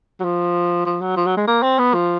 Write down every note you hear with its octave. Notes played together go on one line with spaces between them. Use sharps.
F#3
F3
F3
F#3
F3
F#3
G#3
A#3
C4
B3
F3